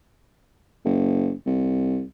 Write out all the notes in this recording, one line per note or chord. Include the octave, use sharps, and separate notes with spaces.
F#1
C2